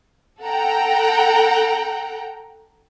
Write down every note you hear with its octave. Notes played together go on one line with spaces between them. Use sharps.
A4 F#5 G5 A#5